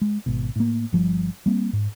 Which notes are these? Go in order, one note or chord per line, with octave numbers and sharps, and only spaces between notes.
G#3
G#1 B2
A2 A#3
G1 F3 G3
G3 A#3 C4
G#2